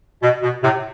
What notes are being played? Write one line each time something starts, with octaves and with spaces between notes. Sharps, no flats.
B2
B2
A2 C3